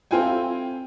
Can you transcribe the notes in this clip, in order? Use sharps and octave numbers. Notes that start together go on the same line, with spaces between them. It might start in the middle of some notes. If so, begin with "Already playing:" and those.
C4 E4 F4 A4 G5 G#5